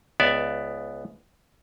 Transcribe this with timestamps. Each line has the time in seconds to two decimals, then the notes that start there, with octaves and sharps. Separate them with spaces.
0.20 C#2 B3 D5 E5